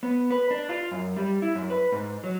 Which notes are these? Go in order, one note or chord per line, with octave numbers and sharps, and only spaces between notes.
B3
B4
D4
F4
F#2
G3
E4
F#2
B4
G#2
F#3